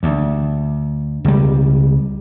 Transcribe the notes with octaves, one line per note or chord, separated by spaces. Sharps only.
D2
C#2 G3